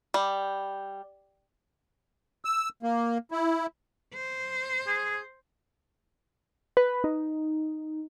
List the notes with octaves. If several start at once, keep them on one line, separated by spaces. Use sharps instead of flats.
G3
E6
A#3
E4
C5
G#4
B4
D#4